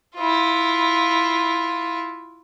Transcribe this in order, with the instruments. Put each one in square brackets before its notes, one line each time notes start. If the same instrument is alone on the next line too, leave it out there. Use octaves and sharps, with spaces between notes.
[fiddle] E4 F4